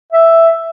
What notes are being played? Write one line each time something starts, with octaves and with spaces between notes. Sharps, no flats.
E5